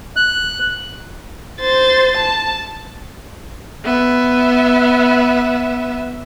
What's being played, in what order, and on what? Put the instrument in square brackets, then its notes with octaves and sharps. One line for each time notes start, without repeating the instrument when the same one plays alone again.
[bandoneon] F#6
[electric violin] C5 A6
A5
[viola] B3 E5